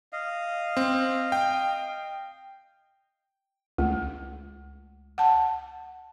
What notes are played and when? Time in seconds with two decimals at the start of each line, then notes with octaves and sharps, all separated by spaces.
0.13 D#5 F5
0.77 C4
1.32 G5
3.78 C#2 A3
5.18 F#5 A5